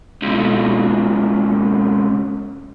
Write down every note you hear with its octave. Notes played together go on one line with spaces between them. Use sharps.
C#2 B2